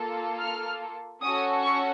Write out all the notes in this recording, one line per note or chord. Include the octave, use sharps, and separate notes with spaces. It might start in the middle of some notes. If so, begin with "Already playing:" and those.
Already playing: A#3 F4 A4
F6
C#4 F#4 A4 D#6
C#6